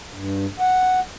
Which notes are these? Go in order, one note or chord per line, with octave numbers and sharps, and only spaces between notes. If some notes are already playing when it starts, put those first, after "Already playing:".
G2
F#5